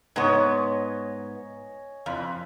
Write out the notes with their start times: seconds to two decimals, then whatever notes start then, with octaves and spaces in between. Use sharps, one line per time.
0.16 G#2 B3 C#5 D#5 G#5
2.06 F2 F5 B5